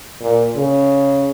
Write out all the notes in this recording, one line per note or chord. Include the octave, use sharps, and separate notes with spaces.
A#2
C#3